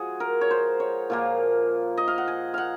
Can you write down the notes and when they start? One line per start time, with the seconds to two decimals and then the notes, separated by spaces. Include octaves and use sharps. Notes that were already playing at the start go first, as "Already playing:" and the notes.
Already playing: F3 G#3 F#4 G#4
0.20 A#4
0.41 C#5
0.51 C5
0.80 C#5
1.10 A#2 F3 A#3
1.97 D#5
2.08 F5
2.18 F#5
2.28 G#5
2.54 F5 F#5